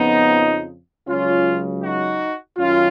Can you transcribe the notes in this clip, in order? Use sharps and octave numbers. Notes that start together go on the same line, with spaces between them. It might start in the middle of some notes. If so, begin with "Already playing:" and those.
Already playing: F2 C#3 F3 B3 D#4
C#2 C#3 F#3 C#4 F4
D#4 F#4
F#2 D#3 C#4 F4